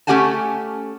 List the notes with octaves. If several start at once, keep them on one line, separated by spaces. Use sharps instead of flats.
A3 C#4 G4 F#5 G#5 A5